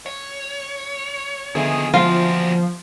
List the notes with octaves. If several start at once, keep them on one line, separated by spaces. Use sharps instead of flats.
C#5
D3 D#3 F3 B3 G#4 E5
A#2 F3 F4 F#4